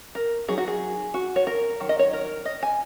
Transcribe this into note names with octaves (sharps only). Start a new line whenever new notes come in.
A#4
F#3 D#4 G#4
F#4
G#4
F#4
C#5
A#4
D#3 F#3
D#5
C#5
A#4
D#5
G#5